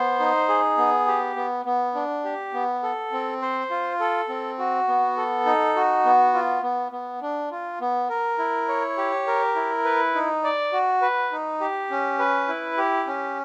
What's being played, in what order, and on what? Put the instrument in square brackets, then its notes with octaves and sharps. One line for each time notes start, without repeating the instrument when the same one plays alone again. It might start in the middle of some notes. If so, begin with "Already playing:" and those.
Already playing: [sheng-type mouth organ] B3 C5
D#4
G#4
B3
G4
B3
B3
D4
G4
B3
A4
C4
C5
F4
A4
C4
F#4
B3
A4
D#4
F#4
B3
F4
B3
B3
D4
F4
B3
A#4
E4
C#5
G4
A#4
E4
B4
D#4
D5
F#4
B4
D#4
G4
C#4
B4
E4
G4
C#4